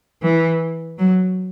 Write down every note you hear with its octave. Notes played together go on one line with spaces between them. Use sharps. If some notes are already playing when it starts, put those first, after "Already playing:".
E3
F#3